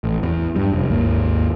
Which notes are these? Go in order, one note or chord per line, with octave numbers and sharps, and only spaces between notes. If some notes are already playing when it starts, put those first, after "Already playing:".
A1
E2
G2 G3
F1
G#1 D#2 A#3